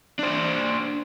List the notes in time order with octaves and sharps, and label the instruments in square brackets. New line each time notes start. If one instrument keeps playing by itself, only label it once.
[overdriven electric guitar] D4 C5